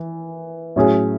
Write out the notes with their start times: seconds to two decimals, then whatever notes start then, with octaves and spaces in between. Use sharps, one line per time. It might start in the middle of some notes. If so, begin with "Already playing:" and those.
Already playing: E3
0.76 A2 F#3 C#4 G#4